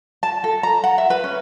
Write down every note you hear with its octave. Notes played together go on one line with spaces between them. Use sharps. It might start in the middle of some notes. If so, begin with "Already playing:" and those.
A5
A4
A#5
F#5
E5
B4
C#4